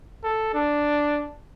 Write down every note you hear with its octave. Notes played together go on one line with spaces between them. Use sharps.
A4
D4